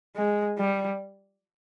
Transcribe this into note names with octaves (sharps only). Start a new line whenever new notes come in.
G#3
G3